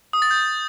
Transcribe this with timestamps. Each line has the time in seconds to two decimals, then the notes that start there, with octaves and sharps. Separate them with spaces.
0.13 D#6
0.22 A6
0.31 G6